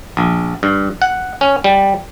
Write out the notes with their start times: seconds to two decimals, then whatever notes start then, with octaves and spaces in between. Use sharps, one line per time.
0.17 A#1
0.63 G2
1.02 F#5
1.41 C#4
1.64 G3